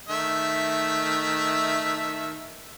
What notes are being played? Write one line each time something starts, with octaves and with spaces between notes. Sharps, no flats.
D#3 A3 E5